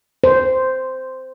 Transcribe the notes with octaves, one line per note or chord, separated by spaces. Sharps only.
C5